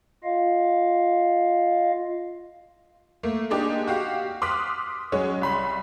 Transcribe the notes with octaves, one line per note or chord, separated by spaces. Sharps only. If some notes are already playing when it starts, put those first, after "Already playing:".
F4 D#5 F5
A3 A#3
G#3 A#3 D4 D#4 G4
F#4 G4 F5
C6 D6 D#6 F6 F#6 B6
F#3 G#3 C#4 C#5
C2 B5 C6